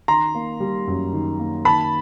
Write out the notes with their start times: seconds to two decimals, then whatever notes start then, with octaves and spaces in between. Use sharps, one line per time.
0.08 D#3 A#5 C6
0.35 A#3
0.60 G3
0.88 F#2
1.13 D#3
1.39 A#3
1.65 D#3 A5 B5